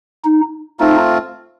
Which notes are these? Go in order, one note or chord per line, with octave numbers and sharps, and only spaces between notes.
D#4
A3 C4 D#4 F4